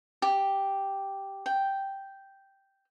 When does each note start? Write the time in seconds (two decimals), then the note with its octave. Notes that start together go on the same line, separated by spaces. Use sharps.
0.22 G4
1.46 G5